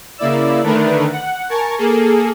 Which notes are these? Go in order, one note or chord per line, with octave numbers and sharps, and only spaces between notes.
C#3 A#3 E4 D5 E6
D3 D#3 A3 D4 A#4 B4
F#5
A#4 G#5 A5 C#6
A#3 G#4 A4